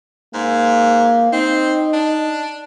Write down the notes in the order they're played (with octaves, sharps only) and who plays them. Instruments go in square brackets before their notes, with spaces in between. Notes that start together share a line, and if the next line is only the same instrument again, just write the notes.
[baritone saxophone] G#2 [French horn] A#3
[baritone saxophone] C4 [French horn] D#4
[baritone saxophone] D4